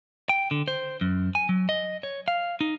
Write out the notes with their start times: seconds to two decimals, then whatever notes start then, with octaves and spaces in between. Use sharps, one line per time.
0.29 G5
0.51 D3
0.68 C5
1.01 F#2
1.35 G#5
1.49 F#3
1.69 D#5
2.03 C#5
2.28 F5
2.61 D#4